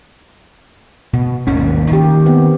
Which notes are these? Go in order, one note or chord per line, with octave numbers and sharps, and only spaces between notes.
B2
G#1 D#2 C#4
A#3
D#3 A#3 G4
B3 C4